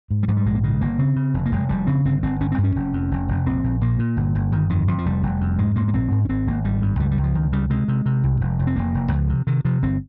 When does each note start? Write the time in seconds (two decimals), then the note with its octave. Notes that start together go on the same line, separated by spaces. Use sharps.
0.11 G#2
0.23 G3
0.28 G#2 F3
0.37 G3
0.46 A#1 G#3
0.55 A#3
0.63 C#3 G#3
0.81 G1 A#3
0.99 C#3 C4
1.16 C#3
1.34 F1
1.46 A#3
1.52 F1 G#3
1.69 F1 G3
1.87 C#3 C4
2.05 G1 C4
2.23 G1 C4
2.40 G1 C#4
2.52 C4
2.58 G2
2.64 C#4
2.76 F1
2.93 F2
3.11 F1
3.28 F1
3.46 A#1 C4
3.64 A#1
3.81 A#2 A#3
3.99 A#2
4.17 G1
4.35 G1
4.52 G1 D#3
4.70 F2 D#3
4.88 F2 F3
4.98 F3
5.06 F1 G3
5.23 F1
5.41 F2
5.58 G#2 G#3
5.76 G#2 A#3
5.88 A#3
5.93 A#1 C4
6.11 G#2
6.25 C#4
6.29 G#1 C4
6.47 G#1 A#3
6.64 G#1 G3
6.82 G2
6.99 C#2 G3
7.11 G3
7.17 C#2
7.23 F3
7.35 C#2 D#3
7.52 C#3 G3
7.70 C3 G#3
7.88 C3
8.06 C3
8.24 C2
8.41 F1
8.59 F1
8.67 C4
8.76 F1 A#3
8.94 F1
9.12 C#2 F3
9.29 C3
9.47 C3 D#3
9.65 C3 F3
9.83 G1 C4